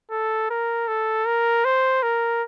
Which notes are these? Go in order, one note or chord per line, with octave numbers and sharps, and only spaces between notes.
A4
A#4
A4
A#4
C5
A#4